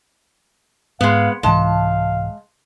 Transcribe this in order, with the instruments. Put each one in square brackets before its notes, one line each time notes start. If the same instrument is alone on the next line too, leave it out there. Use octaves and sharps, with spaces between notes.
[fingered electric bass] G#2 [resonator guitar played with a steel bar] G#3 B3 [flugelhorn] F5
[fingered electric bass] C2 G#2 E3 [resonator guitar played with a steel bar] G#3 A5 [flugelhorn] F5